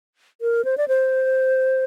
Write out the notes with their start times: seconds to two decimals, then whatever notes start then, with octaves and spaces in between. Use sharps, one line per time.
0.41 A#4
0.65 C5
0.78 D5
0.88 C5